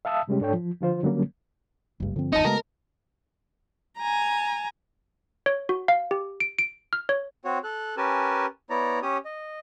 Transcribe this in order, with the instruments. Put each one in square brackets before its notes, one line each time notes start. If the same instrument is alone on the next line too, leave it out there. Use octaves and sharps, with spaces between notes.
[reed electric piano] E5 F5 A5 D#6 E6
C3 G3 G#3 C#4 G4
G#2 D4 A4 C#5 G5
F3
D3 F3 F4 C5
D3 F#3 G3 A#3 C#4
[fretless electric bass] F#1 G2 [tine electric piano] C#2
[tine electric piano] G2 F3 [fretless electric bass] D3 C4
[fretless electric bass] G1 D#2 [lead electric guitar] D#4 [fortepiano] D#5 A5 [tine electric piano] C#7
[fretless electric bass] C#3 G#3 [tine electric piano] A3 B3 F#4 [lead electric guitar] A#4
[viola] G#5 A#5
[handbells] C#5
F#4
F5
G4
D7
D7
F6
C#5
[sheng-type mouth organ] C4 F#4 C#5
A4 F#6
C#4 G4 A#4 B4 G#5 A5
B3 E4 C#5 D5 A#5
C#4 G4 C#5 D#6
D#5